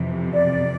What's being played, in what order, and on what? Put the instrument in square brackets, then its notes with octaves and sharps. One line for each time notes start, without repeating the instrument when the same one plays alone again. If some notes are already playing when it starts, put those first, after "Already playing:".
Already playing: [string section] F2 C3 E3
[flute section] D5